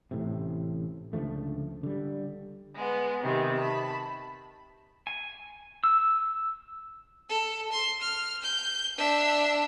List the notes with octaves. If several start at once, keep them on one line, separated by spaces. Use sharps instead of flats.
A1 A2 C3
C#2 D3 F3 A3
D3 G3
G#3 B3
C3 D#3 B3 C4
A5 B5
G#5
E6
A4
C6
F6
G6
D4 E5